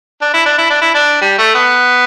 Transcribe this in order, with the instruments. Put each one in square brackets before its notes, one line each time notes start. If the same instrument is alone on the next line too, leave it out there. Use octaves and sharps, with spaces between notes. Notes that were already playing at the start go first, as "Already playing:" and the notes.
[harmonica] D4
E4
D4
E4
D4
E4
D4
G3
A3
B3